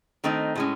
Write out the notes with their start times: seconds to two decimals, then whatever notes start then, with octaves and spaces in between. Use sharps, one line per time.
0.24 D#3 A3 C4 D#4
0.55 A2 G#3 C#4